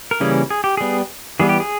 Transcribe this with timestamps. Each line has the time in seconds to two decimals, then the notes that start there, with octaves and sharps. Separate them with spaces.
0.11 A#4
0.20 C#3 E3 G3 A#3 C#4 G#4
0.50 G#4
0.64 G4
0.77 G3 B3 G#4
1.40 E3 G3 B3 G#4
1.49 G4
1.60 G#4